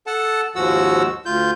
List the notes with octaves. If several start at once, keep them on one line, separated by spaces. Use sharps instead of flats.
A4 F#5 A5
D#2 G#2 F3 F#4 F#5 E6
D2 F4 G6